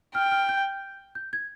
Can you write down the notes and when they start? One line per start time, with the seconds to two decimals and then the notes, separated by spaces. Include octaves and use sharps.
0.15 G5 F6
0.31 F6
0.49 G6
1.15 G6
1.33 G#6